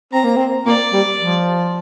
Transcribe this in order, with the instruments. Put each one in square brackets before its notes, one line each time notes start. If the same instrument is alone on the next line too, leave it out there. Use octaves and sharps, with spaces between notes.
[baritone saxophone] C4 [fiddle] A#5
[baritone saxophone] A#3
C4
[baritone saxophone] A#3 [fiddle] D5
[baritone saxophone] G3
F3